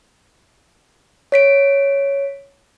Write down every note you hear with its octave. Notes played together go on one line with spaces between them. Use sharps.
C#5 B6 D7